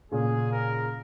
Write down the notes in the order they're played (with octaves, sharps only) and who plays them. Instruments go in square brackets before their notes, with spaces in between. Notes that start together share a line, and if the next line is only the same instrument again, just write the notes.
[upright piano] A#2 C#3 [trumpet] G#4
[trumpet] A#4